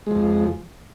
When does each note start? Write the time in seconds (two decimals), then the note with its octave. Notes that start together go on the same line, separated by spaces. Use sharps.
0.06 G#3
0.11 F3
0.15 F2